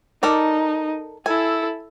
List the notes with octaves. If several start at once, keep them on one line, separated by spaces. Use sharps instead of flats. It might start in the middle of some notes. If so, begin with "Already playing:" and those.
D#4 A4 A#4 D5
E4 A4 G#5